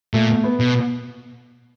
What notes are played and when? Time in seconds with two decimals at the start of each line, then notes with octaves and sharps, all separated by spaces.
0.13 A#2 A3
0.44 B3
0.60 B2